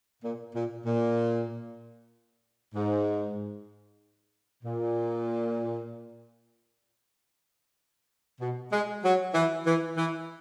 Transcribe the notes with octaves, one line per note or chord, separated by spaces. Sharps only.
A#2
A#2
A#2
G#2
A#2
B2
G#3
F#3
E3
E3
E3